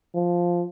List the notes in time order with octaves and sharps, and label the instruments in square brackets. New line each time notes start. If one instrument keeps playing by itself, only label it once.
[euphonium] F3